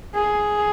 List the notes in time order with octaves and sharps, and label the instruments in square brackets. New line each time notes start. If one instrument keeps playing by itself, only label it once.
[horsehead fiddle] G#4